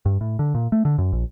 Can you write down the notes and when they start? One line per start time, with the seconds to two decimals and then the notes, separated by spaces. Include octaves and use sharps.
0.06 G2
0.21 A2
0.39 D3
0.54 A#2
0.72 A3
0.85 D3
0.98 F#2
1.12 A#1